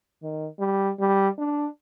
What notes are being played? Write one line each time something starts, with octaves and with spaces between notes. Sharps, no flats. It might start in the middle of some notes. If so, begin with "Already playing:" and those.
D#3
G3
G3
D4